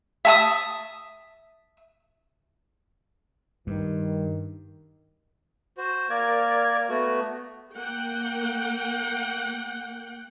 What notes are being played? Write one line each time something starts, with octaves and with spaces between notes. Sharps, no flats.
E5 A5 D#6
G2 D#3
F#4 C5
A#3 A#4 D5 G#6
A3 B3 F#4
A#3 F#5 G5